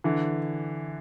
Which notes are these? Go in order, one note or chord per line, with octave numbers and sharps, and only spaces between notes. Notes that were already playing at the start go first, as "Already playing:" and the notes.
D3 E3